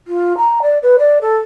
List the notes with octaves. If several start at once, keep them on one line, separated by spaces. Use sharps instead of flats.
F4
A#5
D5
B4
D5
A4